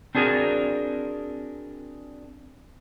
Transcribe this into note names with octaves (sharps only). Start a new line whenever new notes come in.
C4 D4 F#4 G#4 A#4